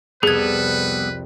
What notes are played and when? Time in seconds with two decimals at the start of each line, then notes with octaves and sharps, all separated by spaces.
0.23 C2 F2 G3 B3 G#4 A4 B4 G#6